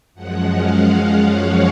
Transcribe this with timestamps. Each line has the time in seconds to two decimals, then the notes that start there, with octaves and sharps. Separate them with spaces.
0.14 F#2 F3 G#3 F#5
0.51 F5
1.25 C#5